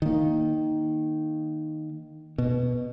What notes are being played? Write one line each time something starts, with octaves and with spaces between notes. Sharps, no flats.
D#3 A#3
B2